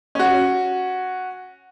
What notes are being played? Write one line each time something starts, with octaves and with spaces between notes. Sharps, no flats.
C#4 F#4